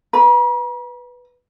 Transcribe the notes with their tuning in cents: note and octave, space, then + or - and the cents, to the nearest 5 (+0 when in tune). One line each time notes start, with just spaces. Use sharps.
B4 +0 A#5 +45